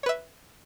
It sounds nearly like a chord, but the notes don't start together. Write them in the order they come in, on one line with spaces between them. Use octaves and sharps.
C#5 B4 E5